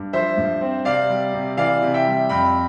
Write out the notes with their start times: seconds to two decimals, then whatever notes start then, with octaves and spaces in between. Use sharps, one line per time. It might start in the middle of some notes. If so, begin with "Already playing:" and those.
Already playing: G2
0.13 F3 C5 E5
0.38 G2
0.61 C4
0.85 C3 D5 F5
1.09 G3
1.34 C3
1.57 E3 D5 F5
1.82 C3
1.94 E5 G5
2.06 G3
2.29 F2 G5 B5